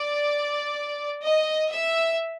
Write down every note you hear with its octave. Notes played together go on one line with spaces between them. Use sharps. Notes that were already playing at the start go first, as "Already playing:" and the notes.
Already playing: D5
D#5
E5